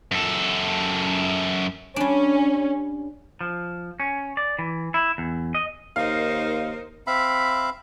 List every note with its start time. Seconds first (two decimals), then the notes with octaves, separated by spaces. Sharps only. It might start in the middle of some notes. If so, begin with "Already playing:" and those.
0.11 F#2 A4
1.96 G3 C#4 D4
3.41 F3
4.00 C#4
4.37 D5
4.59 E3
4.94 E4
5.18 E2
5.55 D#5
5.96 D#2 D#4 A#4 C5 F5
7.07 C4 E5 F5 B5